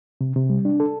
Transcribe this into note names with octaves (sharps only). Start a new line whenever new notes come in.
C3
C3
G3
D4
A4